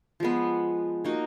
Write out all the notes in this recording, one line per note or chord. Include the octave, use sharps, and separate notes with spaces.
F3 G#3 B3
A#3 D#4 F#4